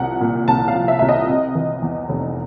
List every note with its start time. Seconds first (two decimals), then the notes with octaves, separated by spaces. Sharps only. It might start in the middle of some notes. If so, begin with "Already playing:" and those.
Already playing: C2 F3 F#5
0.21 A#2
0.48 C2 A5
0.68 F5
0.75 F3
0.88 E5
0.99 C2 E5
1.09 D#5
1.29 C3
1.55 E3
1.82 E2
2.09 F1